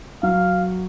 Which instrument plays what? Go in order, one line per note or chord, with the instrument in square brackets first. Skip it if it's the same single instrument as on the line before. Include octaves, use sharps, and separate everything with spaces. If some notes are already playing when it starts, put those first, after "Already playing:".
[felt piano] F#3 [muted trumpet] F5